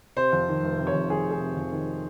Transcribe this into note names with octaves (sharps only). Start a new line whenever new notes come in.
C3 C5
F2
D#3
F1
C3
C#5
F2
D#3 G#4
F1
G#4
C3
F2
D#3